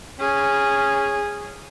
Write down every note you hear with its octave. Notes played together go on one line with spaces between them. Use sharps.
C#4 G#4